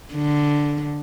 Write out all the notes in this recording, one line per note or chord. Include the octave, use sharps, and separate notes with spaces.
D3